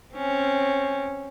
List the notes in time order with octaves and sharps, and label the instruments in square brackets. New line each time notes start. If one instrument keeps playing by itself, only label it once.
[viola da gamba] C4 C#4